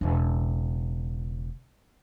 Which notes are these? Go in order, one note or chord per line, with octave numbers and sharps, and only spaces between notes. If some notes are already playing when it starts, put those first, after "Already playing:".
E1 C#3